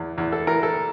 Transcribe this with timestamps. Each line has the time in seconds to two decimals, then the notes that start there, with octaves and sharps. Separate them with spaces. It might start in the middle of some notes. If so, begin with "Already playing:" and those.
Already playing: E2
0.18 E2
0.32 A4
0.47 E3 A#4
0.63 A4